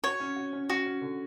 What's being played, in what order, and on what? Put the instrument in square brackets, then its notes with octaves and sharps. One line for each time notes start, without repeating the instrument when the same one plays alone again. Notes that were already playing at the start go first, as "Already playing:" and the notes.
[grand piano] F#4 [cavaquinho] C#5
[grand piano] C#4
F#4
C#4
[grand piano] C#4 [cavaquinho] F#4
[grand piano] C#4
D3